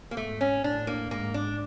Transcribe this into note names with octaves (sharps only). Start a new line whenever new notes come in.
A#3
G#2 A3
C#4
A2 D4
A#3
G#2 A#3
D4